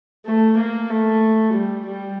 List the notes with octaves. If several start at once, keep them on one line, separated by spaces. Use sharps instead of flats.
A3
A#3
A3
G3
G3